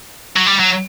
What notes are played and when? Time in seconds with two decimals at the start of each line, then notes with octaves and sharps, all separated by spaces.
0.36 F#3
0.46 G3
0.60 F#3